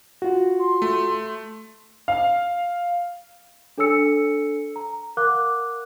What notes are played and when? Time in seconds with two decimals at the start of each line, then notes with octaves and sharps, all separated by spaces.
0.22 F4 F#4
0.59 C6
0.82 A3
2.08 F5
3.78 D4 A4 C#5 G#5 E6 C#7
4.76 A#5
5.17 A#4 F5 F#5 D6 F#6